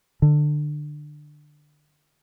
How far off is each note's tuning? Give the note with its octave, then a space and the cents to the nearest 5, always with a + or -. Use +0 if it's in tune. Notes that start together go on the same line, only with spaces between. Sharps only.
D3 +20